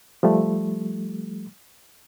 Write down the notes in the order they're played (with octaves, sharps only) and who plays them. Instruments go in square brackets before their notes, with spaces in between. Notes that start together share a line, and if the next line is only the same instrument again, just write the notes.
[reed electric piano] F3 G3 A3